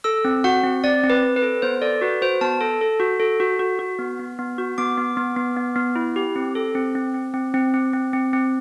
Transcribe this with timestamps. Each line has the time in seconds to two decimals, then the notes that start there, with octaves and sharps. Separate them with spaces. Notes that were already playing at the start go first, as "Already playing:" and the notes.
0.04 A4 E6
0.25 C4
0.44 F#4 F#5
0.64 C4
0.84 C4 D5
1.04 C4
1.10 B4
1.23 C4
1.36 B4
1.42 A4
1.62 B3 C5
1.82 A4 D5
2.01 F#4 B4
2.22 F#4 C5
2.41 B3 A5
2.61 A4
2.81 A4
3.00 F#4
3.20 A4
3.40 F#4
3.59 F#4
3.79 F#4
3.99 B3
4.19 B3
4.39 B3
4.58 F#4
4.78 B3 D6
4.98 B3
5.17 B3
5.36 B3
5.56 B3
5.76 B3
5.96 E4
6.16 G4
6.36 C4
6.55 A4
6.75 C4
6.95 C4
7.14 C4
7.34 C4
7.54 C4
7.74 C4
7.93 C4
8.13 C4
8.33 C4